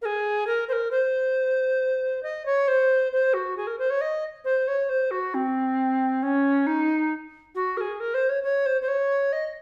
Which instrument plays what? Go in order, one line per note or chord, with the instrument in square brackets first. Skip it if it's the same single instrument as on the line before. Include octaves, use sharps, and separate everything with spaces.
[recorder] A#4
G#4
A#4
C5
A#4
C5
D#5
C#5
C5
C5
F#4
G#4
A#4
C5
C#5
D#5
C5
C#5
C5
F#4
C4
C#4
D#4
F#4
A#4
G#4
A#4
C5
C#5
C#5
C5
C5
C#5
D#5